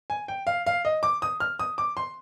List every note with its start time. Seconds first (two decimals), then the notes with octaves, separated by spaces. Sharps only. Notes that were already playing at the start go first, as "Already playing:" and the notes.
0.10 G#5
0.28 G5
0.47 F5
0.66 F5
0.85 D#5
1.03 D6
1.22 D#6
1.40 F6
1.59 D#6
1.78 D6
1.97 C6